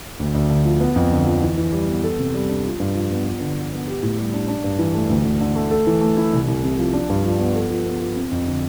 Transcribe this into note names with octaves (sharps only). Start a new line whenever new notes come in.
D2
D2
D3
F3
B3
F2
D3
F3
E3
E3
G3
B3
A4
C3
G3
D4
F4
G2
F3
B3
F4
D3
F3
B3
G4
A2
G3
D4
D4
G2
E3
A3
D2
D2
D3
A3
A4
E3
A3
E4
C2
C2
C3
F3
D4
G2
F3
B3
A4
F3
B3
F4
C4
F2
D3